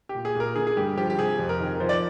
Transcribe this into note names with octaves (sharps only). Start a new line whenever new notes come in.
G4
A#2
G#4
A#2 A#4
D3 G#4
G#4
G2 G4
F3 G4
G4
C3 G#4
F2
A#4
D#3
F3 C5
D5